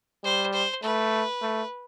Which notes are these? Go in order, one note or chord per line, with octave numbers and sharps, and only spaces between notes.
G3 C5
C5
A3 B4
A3